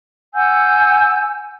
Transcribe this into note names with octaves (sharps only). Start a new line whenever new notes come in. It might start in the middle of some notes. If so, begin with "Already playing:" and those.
F#5 G#5 E6 G6